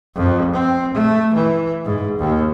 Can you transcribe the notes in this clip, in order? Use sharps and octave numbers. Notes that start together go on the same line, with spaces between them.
F2
C4
A3
E3
G#2
D#2